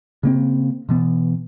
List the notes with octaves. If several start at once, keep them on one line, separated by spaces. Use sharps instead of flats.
C#3 A#3 C4
B2 E3 B3